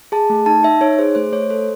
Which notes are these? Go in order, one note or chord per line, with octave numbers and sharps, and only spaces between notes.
G#4 A5
A3
D#4 A5
D#4 E5
D#4 C#5
G#4 C5
A3 C5
A3 C#5
A4 C5